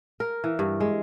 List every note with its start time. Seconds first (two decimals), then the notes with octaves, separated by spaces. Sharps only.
0.20 A#4
0.44 E3
0.59 G2
0.80 G#3